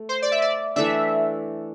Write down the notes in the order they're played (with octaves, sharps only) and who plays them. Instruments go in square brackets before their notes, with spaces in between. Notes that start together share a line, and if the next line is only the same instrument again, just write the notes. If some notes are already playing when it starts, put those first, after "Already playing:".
Already playing: [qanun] A3
[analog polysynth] C5
D5
E5
D5
[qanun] E3 A3 D4 [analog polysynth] E5